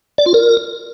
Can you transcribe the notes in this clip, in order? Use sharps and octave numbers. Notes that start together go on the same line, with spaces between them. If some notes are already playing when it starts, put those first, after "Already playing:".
D5
F4
A#4